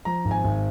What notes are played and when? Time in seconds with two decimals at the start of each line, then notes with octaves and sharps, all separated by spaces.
0.05 F3 A#5
0.25 G#1
0.31 G#5
0.44 G#1